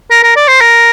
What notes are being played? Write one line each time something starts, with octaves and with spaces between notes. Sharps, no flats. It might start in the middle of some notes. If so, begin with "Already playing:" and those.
A#4
A#4
D5
C5
A#4